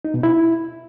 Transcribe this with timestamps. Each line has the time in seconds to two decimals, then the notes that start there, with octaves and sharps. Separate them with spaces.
0.05 D#4
0.14 B2
0.23 E4